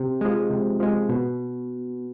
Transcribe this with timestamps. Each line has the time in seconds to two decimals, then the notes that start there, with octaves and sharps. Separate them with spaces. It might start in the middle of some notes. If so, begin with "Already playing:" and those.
Already playing: C3
0.21 F3 G#3
0.50 C3
0.80 F3 G#3
1.09 B2